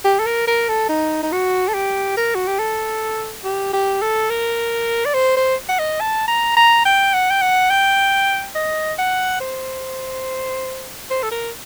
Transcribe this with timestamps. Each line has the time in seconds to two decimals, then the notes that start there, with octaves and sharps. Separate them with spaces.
0.05 G4
0.19 A4
0.26 A#4
0.47 A#4
0.69 A4
0.89 D#4
1.23 D#4
1.32 F#4
1.68 A4
1.74 G4
2.17 A#4
2.35 F#4
2.47 G4
2.59 A4
3.44 G4
3.73 G4
4.02 A4
4.30 A#4
5.05 D5
5.14 C5
5.36 C5
5.69 F#5
5.79 D#5
6.01 A5
6.28 A#5
6.57 A#5
6.85 G5
7.14 F#5
7.31 G5
7.42 F#5
7.70 G5
8.55 D#5
8.98 F#5
9.40 C5
11.11 C5
11.23 A4
11.31 A#4